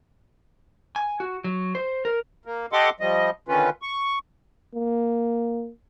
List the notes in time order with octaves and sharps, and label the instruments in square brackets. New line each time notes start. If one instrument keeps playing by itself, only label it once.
[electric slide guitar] G#5
F#4
F#3
C5
A#4
[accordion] A#3
G4 A4 D#5 F#5 C6 D6
F3 G3 D#5
D3 D#3 C#4 F4 B4
C#6
[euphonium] A#3